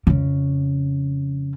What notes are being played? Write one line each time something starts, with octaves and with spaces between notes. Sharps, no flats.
F2 C#3